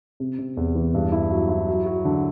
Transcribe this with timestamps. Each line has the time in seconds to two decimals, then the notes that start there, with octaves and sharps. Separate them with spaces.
0.20 C3
0.39 C3
0.57 E2
0.75 E3
0.94 G2
1.12 E4
1.31 F#3
1.49 E4
1.68 F#3
1.86 F#3
2.05 D3